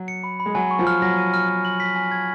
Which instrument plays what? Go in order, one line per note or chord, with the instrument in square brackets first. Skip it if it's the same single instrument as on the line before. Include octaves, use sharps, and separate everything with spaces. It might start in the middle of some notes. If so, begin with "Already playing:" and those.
Already playing: [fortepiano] F#3
[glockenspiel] C#7
B5
B5
[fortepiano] G#3
[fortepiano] F#3 [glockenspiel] G#5
[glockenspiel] C#6
[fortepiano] F3
[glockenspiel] F6
[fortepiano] F#3 [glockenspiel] A#6
[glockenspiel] D#7
F6
F6
F#7
B6
G#5
G#6